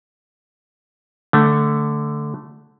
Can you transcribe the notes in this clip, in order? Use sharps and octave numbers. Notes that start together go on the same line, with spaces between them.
D3 A3